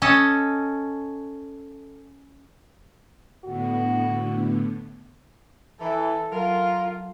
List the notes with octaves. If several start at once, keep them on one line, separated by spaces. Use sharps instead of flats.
C#4 A4 D#5
A2 D3 B3 F#4
E3 A4 E5 A#5
F#3 F4 A#4